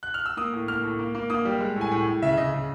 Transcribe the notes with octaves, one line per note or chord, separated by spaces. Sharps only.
F#6
F6
E6
A#3 D#6
A2
A#3 F6
A2
A#3
A#3
A#3 D#6
G3
G#3
A2
G#5
A2
A2
C#3 E5
C#3 D#5
C#3